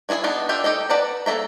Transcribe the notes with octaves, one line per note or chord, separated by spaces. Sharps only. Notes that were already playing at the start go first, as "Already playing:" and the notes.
D#3 E4 F#4 G#4 G#5
B3 D4 D#4 A#4
D4 F4 G4 E5 G5
D#4 G4 A4 D#5
B4 D5 F#5 A5 A#5
A#3 D4 A4 E5 A#5